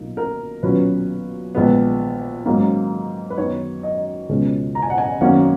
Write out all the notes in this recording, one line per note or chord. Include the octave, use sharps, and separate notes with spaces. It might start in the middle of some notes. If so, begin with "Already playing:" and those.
Already playing: B1 A#2 A#3 D#4
A#4
B1 A#2 F#3 C#4 B4
A#1 A#2 G#3 B3
G#2 F#3 A#3 C#4
B4
F#2 D#3 F#3 B3 D#4 C#5
D#5
C#2 B2 G#3 C#4
A#5
G#5
F#5
G#5
G#1 F#2 D#3 A#3 C#4 F#5